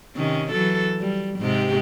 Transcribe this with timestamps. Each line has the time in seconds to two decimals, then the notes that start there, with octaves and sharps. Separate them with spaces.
0.16 C3 D#3 C#4
0.51 E3 F#3 A4
1.00 G3
1.39 G#2 C3 G4